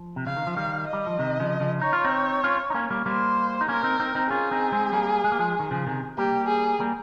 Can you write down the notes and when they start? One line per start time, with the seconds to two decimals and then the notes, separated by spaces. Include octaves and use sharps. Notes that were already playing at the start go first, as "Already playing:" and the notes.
Already playing: F3
0.16 C3
0.26 C#3 F5
0.37 D#3
0.47 F3
0.56 D#3 G3 F5
0.88 D#5
0.93 G3
1.07 F3
1.19 C3 D#3
1.40 C#3 F3
1.60 C#3 F3
1.81 D#4 C#5
1.93 F4
2.04 C4 D#4
2.44 C#4 F4
2.70 D#4
2.74 A#3 C#4
2.90 G3 A#3
3.06 G3 A#3 C5
3.61 D#4
3.68 A#3 C#4 A#4
3.84 C4 D#4
4.00 C4 D#4
4.15 C4 D#4
4.30 C#4 F4 G#4
4.51 C4 D#4
4.72 G#3 C4
4.93 G3 A#3
5.24 G#3
5.32 A#3
5.39 F3 G#3
5.59 D#3
5.71 C#3 F3
5.87 C3 D#3
6.18 G3 A#3 G4
6.48 G#4
6.80 G3 A#3